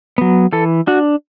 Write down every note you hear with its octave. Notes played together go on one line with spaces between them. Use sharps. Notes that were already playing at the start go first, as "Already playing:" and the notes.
F#3 B3
E3 A4
D4 F#4